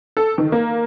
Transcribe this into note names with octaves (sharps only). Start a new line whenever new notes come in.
A4
D#3
A#3